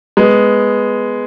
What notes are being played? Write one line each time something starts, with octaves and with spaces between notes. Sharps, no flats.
G#3 B3